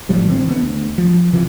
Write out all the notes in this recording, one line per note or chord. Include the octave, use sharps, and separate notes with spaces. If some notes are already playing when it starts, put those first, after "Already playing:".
G#1 A2 F3 G3
D3 E3 G#3 C4
D3 B3
D2
F3
C3 E3 F3